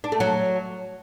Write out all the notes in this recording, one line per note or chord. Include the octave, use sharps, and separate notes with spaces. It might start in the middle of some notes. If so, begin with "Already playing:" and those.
D4
A3
F#3